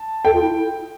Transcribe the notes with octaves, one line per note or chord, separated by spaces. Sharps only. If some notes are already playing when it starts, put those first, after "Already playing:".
Already playing: A5
A4 G5
F4
E4